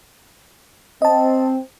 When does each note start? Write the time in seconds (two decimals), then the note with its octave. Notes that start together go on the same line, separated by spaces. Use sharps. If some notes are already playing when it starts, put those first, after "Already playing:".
1.02 C4 D#5 A5